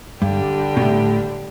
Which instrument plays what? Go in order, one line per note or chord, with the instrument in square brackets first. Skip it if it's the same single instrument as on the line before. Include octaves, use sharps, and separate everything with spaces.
[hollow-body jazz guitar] G2 [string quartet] D3 G3 D4 G4
[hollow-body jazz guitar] B2
A2